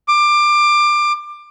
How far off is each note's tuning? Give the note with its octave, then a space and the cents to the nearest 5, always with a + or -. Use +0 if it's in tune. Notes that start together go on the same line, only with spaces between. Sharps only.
D6 +20